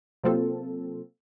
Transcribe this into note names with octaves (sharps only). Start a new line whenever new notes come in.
C3 F#3 A#3 C4 F4 A4